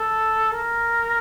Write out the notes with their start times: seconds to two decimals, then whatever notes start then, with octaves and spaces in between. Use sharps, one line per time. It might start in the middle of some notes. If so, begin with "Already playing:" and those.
Already playing: A4
0.53 A#4